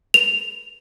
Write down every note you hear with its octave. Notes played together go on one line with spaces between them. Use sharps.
F7